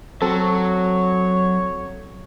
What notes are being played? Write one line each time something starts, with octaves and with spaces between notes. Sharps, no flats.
F#3 C4 A4 C#5